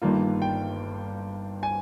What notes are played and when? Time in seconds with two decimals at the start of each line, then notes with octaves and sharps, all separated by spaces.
0.02 G1 G2 D#3 A#3 F4
0.42 G5
1.63 G#5